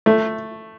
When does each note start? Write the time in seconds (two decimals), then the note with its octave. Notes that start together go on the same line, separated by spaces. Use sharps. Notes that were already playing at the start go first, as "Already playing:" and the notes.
0.06 A3